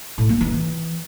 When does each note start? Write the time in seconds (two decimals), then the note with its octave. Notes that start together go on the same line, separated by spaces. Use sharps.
0.18 A2
0.29 A#3
0.41 E3